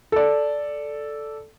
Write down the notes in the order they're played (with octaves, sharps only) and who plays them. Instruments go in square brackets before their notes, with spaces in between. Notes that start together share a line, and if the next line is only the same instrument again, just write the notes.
[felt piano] A4 D5